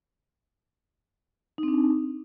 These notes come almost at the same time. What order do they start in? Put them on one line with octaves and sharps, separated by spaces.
D#4 C4 D4